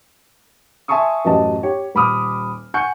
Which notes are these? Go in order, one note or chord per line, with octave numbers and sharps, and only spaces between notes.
E5 G#5 A5 C6 C#6 D#6
A1 F#2 F#3 G4 D#5 A5
G4 C#5
D#1 B5 D6 D#6 F6
F#5 G#5 C#6 F#6 G6 C#7